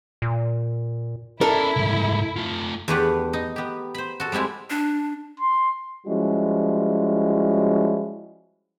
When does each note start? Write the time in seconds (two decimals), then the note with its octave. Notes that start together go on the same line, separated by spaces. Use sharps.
0.22 A#2
1.41 C#4 E4 A4 A#4 D5
1.76 C2 G#2
2.36 A3 F4
2.88 E2 A3 D4 G4 B4 F#5
3.33 D#4
3.56 B3 G4
3.94 C5 B5
4.20 F#4 A4
4.32 G3 G#3 C4 E4
4.70 D4
5.40 C6
6.06 F3 G3 G#3 C#4 E4 F#4